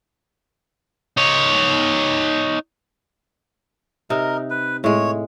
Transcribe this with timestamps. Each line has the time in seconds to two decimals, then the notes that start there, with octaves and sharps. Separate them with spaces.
1.17 D#4 C#5
4.10 C3 D#4 A#4 D#5
4.50 B4
4.84 A2 G#3 C#5